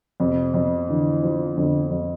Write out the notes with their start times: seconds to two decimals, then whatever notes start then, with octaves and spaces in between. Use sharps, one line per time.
0.20 F2 C3
0.54 F2
0.88 D3 E3
1.23 F3
1.57 F2 D3
1.91 F2